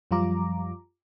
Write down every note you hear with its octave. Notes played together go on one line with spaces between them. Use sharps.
F#2 F3 G3 F4 A#5 D6